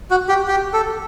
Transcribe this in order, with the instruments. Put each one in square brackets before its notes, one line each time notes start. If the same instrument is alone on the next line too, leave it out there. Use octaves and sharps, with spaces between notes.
[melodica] F#4
G4
G4
A4